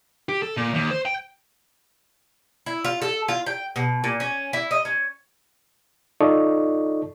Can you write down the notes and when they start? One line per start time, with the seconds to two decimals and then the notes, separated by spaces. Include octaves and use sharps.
0.29 G4
0.42 A4
0.57 A#2
0.74 D#2
0.91 C5
1.05 G5
2.66 E4
2.84 F4
3.02 A4
3.28 F4
3.46 G5
3.76 B2
4.04 A#2
4.20 C#4
4.53 E4
4.71 D#5
4.85 C#4
6.21 D#4 F4 A4 D5 D#5 C#6